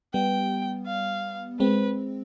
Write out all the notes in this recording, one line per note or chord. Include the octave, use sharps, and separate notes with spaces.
G3 B3 G5
F5
G#3 C4 B4